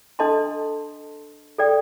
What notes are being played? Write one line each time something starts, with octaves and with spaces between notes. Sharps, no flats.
D4 A4 D#5 A5 C6
A4 D5 G5